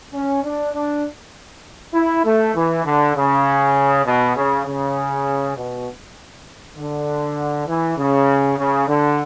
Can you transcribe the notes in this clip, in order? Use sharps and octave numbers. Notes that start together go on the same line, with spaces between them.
C#4
D4
D4
E4
A3
E3
D3
C#3
B2
C#3
C#3
B2
D3
E3
C#3
C#3
D3